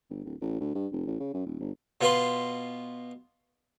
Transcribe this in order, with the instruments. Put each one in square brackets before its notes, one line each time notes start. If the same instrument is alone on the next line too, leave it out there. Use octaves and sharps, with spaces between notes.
[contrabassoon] G1
D1
A1
D2
G2
F1
A1
C#3
F#2
D#1
G1
[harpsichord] B2 F4 B4 C6